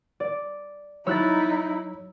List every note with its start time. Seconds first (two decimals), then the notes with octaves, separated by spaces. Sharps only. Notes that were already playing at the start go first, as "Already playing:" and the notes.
0.20 D5
1.07 F#3 D#4 E4 C#5 E6 F#6 A6